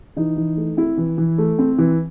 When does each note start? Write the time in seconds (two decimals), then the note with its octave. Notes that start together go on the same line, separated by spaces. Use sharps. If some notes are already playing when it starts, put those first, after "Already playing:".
0.16 E3 D#4
0.37 E3
0.57 A3
0.77 C4 E4
0.97 E3
1.18 E3
1.38 A3
1.59 C4
1.78 E3